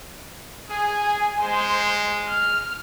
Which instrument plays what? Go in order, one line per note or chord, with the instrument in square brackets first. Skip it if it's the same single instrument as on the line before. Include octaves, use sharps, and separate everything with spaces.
[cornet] G#4 [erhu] G#5
[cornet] G#3 [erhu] C5
[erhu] F6